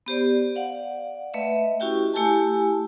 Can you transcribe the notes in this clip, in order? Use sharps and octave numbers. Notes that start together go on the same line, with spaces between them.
B3 G4 C5 D5
D5 F5 F#5
A3 B4 D#5 E5
C#4 E4 F#4 G4 G5
A3 E4 G4 A4 G#5 A5